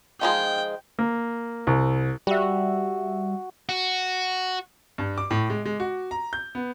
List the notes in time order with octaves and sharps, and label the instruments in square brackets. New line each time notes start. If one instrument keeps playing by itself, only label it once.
[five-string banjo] D#3 F3 G#3 [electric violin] G5
[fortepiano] A#3
C2
[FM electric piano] G3 E5 [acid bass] F#4
[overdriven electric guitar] F#4
[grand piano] G2
D6
A2
G#3
G#3
F#4
A#5
G6
B3